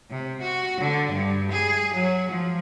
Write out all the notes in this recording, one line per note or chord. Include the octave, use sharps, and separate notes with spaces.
C3
F#4
D3
G2
G#4
F#3
F3